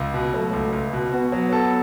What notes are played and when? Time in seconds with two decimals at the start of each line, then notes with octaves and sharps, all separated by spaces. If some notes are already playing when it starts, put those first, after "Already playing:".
Already playing: C#2
0.14 B2
0.33 F#3 A3
0.53 C#2
0.73 C#2
0.93 B2
1.12 B3 F#4
1.32 F#3
1.53 A4